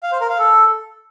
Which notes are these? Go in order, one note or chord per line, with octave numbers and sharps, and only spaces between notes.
F5
C5
A#4
F5
A4